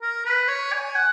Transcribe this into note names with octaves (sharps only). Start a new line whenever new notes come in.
A#4
B4
C#5
G#5
F#5